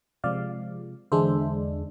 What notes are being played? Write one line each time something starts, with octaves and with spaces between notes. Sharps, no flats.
C3 F3 G#3 D5 F5
E2 D3 G#3 D4 C5 E5